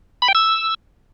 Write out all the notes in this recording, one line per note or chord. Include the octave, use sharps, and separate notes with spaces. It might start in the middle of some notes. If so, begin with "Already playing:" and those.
B5
G5
E6